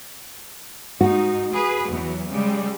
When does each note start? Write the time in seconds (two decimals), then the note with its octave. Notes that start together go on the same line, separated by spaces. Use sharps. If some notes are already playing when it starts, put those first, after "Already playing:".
1.01 G#2 D#4 F#4
1.53 G#4 B4
1.91 E2 E3 F#3
2.31 C#3 G3 G#3